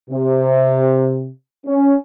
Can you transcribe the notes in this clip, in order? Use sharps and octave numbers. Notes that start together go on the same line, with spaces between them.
C3
C#4